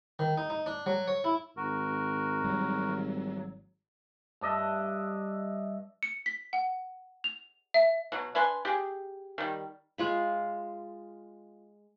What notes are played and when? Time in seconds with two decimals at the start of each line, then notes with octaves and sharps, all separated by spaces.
0.19 D#3
0.37 D#4
0.50 D#4
0.66 D4
0.86 F#3
1.08 C#5
1.24 E4
1.57 G#1 F#4 A#4
2.44 F#3 G3
4.41 G2 D4 D#5 E5
6.03 C#7
6.26 B6
6.53 F#5
7.24 F7
7.74 E5
8.12 B2 F#3
8.35 D4 B4 G#5 C6
8.65 G4 G#4
9.38 D#3 G3
9.98 G#3 F4 B5